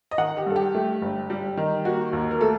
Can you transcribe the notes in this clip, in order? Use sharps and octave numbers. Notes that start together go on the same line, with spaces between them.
D#5
D#3 F#5
G4
G2 A4
G4
A3
G1
G3
D#3
A#3 F#4
D#2
A#4
A3 A4